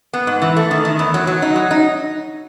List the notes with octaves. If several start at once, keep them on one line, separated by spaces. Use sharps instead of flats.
B3
G#2
E3
A3
D#3
D#3
E2
F#3
F#3
D#4
F#3
D#4